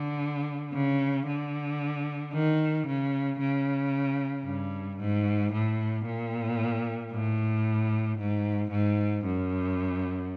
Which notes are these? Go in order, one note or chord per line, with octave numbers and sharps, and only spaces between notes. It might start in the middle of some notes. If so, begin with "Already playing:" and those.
Already playing: D3
C#3
D3
D#3
C#3
C#3
G2
G#2
A2
A#2
A2
G#2
G#2
F#2